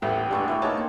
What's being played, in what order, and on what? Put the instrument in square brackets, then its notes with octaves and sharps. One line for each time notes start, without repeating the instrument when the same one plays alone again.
[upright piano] D#1 A1 E2 [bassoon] A3 [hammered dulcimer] F#5 B5 [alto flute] G5
[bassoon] G2 [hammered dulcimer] G#3 A3 D4
[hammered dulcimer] B2 A3 B4 [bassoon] E4
[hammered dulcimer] A#3 G#4 [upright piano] D#4 C#5 A5
[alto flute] A#3 [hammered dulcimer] C4 A4